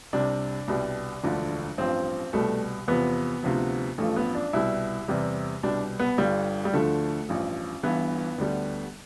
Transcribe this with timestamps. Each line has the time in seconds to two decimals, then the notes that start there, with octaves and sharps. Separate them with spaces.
0.13 C2 C3 G3 D4
0.68 C2 B2 G3
1.23 E1 D2 D3 F3
1.78 A1 G2 F3 C4
2.33 C2 B2 G3 A3
2.88 E2 C3 F3 B3
3.43 D2 C3 F3
3.98 A1 G2 F3 A3
4.16 B3
4.35 D4
4.53 C2 B2 G3 E4
5.08 E2 C3 G3
5.63 C2 B2 G3 D4
6.00 B3
6.18 G1 G2 D3 G3
6.65 G3
6.73 D2 D3 F3 A3
7.29 A1 G2 F3
7.83 G1 G2 E3 B3
8.38 D2 D3 G3